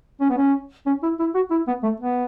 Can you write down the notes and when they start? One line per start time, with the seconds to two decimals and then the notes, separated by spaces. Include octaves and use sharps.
0.21 C#4
0.30 B3
0.37 C#4
0.86 C#4
1.03 E4
1.19 E4
1.35 F#4
1.51 E4
1.67 B3
1.83 A3
2.00 B3